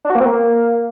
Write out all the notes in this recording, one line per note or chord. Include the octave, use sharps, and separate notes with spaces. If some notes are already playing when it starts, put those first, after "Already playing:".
D4
F#4
A#3
C4
A#3